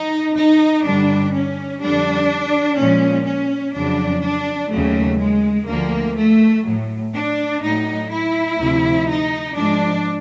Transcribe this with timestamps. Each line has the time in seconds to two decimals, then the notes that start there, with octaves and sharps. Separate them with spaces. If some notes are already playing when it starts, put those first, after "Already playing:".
Already playing: D#4
0.36 D#4
0.85 G2 D3 G3 D4
1.33 C#4
1.81 F2 D3 G3 D4
2.78 A#2 F3 G#3 C#4
3.26 C#4
3.74 F2 C#3 F#3 D4
4.23 D4
4.71 D#2 C#3 F#3 A3
5.19 G#3
5.68 D2 D3 F3 A#3
6.16 A3
6.65 A2 F#3
7.13 D4
7.61 A2 F#3 D#4
8.09 E4
8.58 D2 C3 F3
9.07 D#4
9.54 G#2 F3 G#3 D4